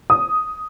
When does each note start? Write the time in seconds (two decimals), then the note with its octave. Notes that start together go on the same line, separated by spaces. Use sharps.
0.10 D#6